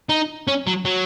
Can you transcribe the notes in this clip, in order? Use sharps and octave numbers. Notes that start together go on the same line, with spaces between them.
D#4
C#4
F#3
F#3